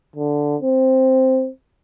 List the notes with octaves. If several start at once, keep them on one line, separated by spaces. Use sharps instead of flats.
D3
C4